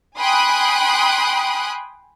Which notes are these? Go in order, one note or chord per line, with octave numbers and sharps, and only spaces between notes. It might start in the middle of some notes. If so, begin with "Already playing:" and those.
G5 G#5 B5 C6 D#6 F#6